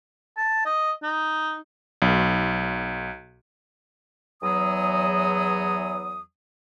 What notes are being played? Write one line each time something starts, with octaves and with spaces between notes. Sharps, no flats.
A5
D#5
D#4
B1
E2 F#3 D#6